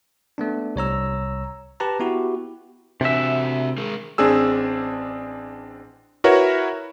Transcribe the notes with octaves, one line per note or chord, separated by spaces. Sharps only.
A3 B3 D4
C2 C#5 A#5 E6
G4 B4 A5 A#5
B3 E4 F#4 G4
C3 D4 F#4 E5 G#5
G#3 G#4 A#4
A1 C4 D4 G#4 E6
E4 F#4 A#4 B4 C#5 E5